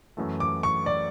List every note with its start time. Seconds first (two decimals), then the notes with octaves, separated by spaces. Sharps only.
0.17 F#2 E3 A3
0.40 D6
0.63 C#6
0.86 D5